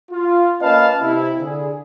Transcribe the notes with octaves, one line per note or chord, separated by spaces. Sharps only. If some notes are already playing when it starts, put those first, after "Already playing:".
F4
A#3 C#4 B4 D#5 F5 A5
C3 E4
D3 G#4